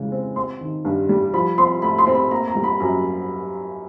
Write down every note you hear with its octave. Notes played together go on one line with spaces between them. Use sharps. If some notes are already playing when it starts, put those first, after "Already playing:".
Already playing: C#3 E3 G#3
C4
C4 C6
D#3
G2
G3
F3 B5
C4 C6
A3 B5
C6
C4
B5
A#3 A#5
A#5
G3
B5
F#2 A#5